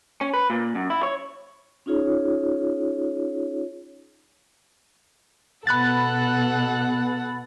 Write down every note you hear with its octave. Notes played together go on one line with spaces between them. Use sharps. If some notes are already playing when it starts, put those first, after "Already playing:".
C#4
B4
A#2
F#2
E4
C#5
C#4 D#4 F4 G#4 C#5
B2 B3 A4 F#5 B5 F#6 A6